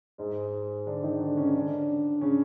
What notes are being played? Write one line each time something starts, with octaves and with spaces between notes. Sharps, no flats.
G#2 G#3
D3 D4
D#3 D#4
D3 D4
C#3 C#4
D3 D4
C#3 C#4